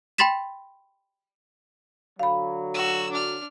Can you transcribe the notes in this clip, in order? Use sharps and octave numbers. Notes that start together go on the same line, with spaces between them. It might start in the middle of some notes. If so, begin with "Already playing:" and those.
G5 B5 C6 A6 B6 E7
D3 F#3 F5 B5
F#4 E6
D4 F6